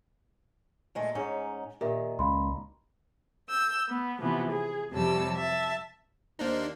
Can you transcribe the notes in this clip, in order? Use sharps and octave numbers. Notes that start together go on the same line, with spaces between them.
A#2 G#3 A3
G#2 C#4 D#4 G#4 C#5
A#2 D#3 G4 A#4 E5
C#2 F5 B5 C6
E6 G6
B3
C3 E3 F3 B3
G#4
F2 C3 F#3 G3 A5 E6
E5 A5
D#2 A#3 D4 D#4 C5